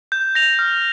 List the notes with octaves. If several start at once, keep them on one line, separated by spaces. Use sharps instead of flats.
G6
A#6 F7
F6